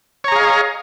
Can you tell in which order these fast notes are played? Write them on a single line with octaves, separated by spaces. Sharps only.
C#5 A#5 G#4 F5 D#5